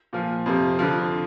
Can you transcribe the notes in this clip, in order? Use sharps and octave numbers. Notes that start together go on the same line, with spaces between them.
A#2 F3
F2 C3 F3
F2 D3 F3